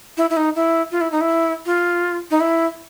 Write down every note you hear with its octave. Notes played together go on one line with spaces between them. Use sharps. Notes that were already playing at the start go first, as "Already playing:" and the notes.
E4
E4
D#4
E4
F4
E4
D#4
E4
F4
D#4
E4